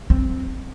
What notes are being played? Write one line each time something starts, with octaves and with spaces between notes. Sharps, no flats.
C4